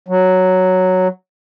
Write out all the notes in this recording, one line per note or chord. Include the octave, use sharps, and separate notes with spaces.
F#3